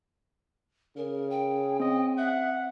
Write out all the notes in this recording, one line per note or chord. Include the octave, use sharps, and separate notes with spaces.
C#3 G#4 A#4
G5
C4 D#5
E5 F#5